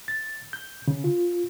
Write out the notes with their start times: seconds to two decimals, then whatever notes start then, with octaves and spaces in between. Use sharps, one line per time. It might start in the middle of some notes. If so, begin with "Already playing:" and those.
0.08 A6
0.53 G6
0.88 C#3
1.04 F4